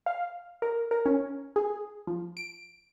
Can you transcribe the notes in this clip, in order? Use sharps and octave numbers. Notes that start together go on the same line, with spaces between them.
F5
A#4
A#4
C#4
G#4
F3
D7